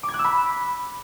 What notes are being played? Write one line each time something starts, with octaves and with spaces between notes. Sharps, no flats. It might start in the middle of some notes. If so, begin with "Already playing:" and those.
D6
G#6
F#6
E6
B5